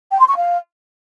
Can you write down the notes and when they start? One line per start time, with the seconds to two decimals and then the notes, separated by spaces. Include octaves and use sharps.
0.10 G5
0.19 C6
0.27 C#6
0.36 F5